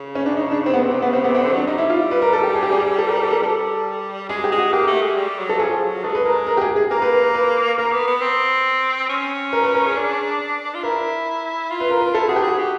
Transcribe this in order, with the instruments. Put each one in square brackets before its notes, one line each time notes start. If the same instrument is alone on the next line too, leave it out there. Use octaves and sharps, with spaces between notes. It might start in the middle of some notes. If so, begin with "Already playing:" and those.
Already playing: [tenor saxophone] C#3
[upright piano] C#4
D4
D#4
D4
C4
B3
[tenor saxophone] C3 [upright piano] C4
[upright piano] C4
[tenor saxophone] C#3 [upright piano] B3
[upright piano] C4
[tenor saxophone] C3 [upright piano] B3
[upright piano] C4
[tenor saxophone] D3
[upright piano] C4
[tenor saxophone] F#3 [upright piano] D4
[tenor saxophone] G3 [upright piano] D#4
[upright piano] E4
F4
B4
A#4
A4
G4
G#4
G4
G#4
A4
A#4
A4
A#4
[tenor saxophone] G3 [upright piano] A4
[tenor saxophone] G#3 [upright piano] G#4
[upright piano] G4
[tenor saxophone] G#3
[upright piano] F#4
[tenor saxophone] A#3 [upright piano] G4
[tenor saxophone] A3
G#3
G3
F#3
[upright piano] A4
[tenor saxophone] F3 [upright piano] G#4
[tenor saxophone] F#3
[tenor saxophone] G#3 [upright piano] A4
[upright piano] B4
A#4
A#4
G4
G#4
G#4
[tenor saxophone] A#3 [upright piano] A#4
[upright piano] B4
B4
A#4
B4
[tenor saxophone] A#3 [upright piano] A#4
[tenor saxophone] B3
B3
C4
C#4
[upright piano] A#4
B4
A#4
G#4
[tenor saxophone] D4
F4
[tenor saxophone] E4 [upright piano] A#4
[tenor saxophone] F4
[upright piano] B4
A#4
B4
[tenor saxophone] E4 [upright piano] A4
[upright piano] F#4 [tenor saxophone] G#4
[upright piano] G4
[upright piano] F#4 [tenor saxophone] G#4
[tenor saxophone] G4